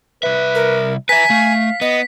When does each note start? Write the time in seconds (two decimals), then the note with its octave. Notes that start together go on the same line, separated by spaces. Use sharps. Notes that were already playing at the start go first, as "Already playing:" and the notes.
0.23 C2 B4 E5
0.55 A#4
1.09 B4 E5 G#5 A#5 B6
1.30 A3 F5
1.81 B3 D#5